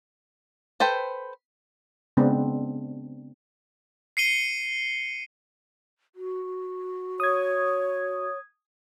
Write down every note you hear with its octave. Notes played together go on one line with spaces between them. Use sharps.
A4 B4 C5 G5
C#3 G#3 B3 C4 D4
C7 C#7 D#7 G7
F#4
C#5 D#6 G#6